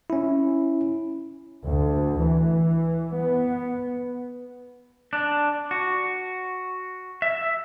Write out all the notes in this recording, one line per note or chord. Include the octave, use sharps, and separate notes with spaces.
C#4 E4
D2
E3
B3
D4
F#4
E5